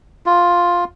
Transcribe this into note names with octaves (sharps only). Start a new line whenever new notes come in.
F4